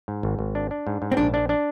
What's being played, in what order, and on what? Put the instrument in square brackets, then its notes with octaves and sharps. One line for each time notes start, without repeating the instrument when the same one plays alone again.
[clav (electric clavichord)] G#2
G#1
G#1
D4
D4
G#2
G#2
[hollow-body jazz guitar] C4
[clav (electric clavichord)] A#1 [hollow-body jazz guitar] D4
[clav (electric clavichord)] D4
D4